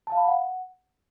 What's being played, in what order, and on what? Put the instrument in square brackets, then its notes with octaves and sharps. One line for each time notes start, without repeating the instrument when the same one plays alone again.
[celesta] A5
F5
B5
F5
F#5